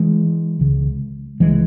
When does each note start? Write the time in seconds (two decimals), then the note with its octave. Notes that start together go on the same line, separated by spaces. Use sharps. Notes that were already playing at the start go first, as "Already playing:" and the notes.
Already playing: E3 G#3
0.59 C#2 C#3
1.40 C#2 C#3 E3 G#3